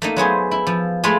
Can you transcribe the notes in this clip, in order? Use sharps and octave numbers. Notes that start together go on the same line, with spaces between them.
A3 A#3 D#4
F#3 B3 G#4 C5
E4
F3
G#3 A3 E4 F4 G#4